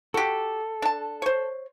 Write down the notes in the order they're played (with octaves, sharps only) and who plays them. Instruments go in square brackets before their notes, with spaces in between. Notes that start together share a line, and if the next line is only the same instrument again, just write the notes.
[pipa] F#4 G4 [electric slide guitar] A4
[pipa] D4 A5
C5 C#5